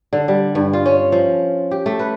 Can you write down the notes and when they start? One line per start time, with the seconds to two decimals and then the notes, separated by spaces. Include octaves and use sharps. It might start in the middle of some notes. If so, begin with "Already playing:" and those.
0.13 D3
0.28 G3
0.55 G2
0.73 F4
0.86 C#4
1.12 F3
1.71 G4
1.86 A3
1.99 B4